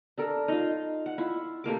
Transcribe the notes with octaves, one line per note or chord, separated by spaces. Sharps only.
D4 A4 A#4
D#4 F4
F#5
E4 F4
C3 A3 A#3 D6